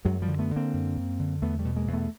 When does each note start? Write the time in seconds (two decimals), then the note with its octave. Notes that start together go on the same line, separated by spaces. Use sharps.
0.05 F#2 F#3 G#3
0.22 F3 G3
0.28 D3
0.39 A3 B3
0.51 D3
0.56 A#3 C4
0.73 F#2
0.97 F#2
1.19 D3
1.42 E2 A3 B3
1.59 G3 A3
1.65 B2
1.76 G#3 A#3
1.87 E2
1.93 A3 B3